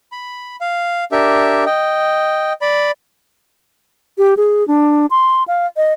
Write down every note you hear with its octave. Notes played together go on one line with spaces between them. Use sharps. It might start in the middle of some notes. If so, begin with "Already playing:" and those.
B5
F5
D4 G4 A#4 E5
D#5 G5
D5 B5
G4
G#4
D4
C6
F5
D#5